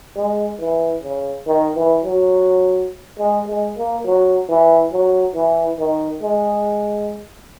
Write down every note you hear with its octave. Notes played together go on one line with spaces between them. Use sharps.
G#3
E3
C#3
D#3
E3
F#3
G#3
G#3
A#3
F#3
E3
F#3
E3
D#3
G#3